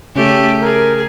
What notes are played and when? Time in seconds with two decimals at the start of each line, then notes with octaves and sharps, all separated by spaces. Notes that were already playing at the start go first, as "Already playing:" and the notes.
0.16 C#3 A3 C#4 G4
0.62 G#4 A#4